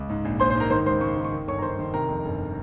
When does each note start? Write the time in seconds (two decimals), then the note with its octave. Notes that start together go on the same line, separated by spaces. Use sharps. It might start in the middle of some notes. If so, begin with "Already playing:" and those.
Already playing: C#2
0.09 G#2
0.25 A#1
0.40 A#1 C5 C6
0.50 C5 C6
0.55 G#2
0.60 A#4 A#5
0.70 D#3 C5 C6
0.86 C#2 C5 C6
1.01 C#2 C#6
1.17 D#3
1.25 C#6
1.32 D#3
1.47 G1 C#5 C#6
1.59 A#5
1.62 D#3 C5 C6
1.79 D#3
1.94 C3 A#4 A#5
2.08 F2
2.25 G1